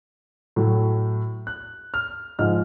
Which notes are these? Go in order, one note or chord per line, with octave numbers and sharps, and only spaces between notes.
A2 F#3 A3
F#6
F6
G#2 F3 G#3 F6